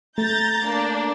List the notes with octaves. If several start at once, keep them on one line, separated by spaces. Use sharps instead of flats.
A3 A#5 G6 A6
A#3 D4